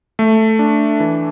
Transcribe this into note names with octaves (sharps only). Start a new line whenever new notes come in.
A3
D4
E3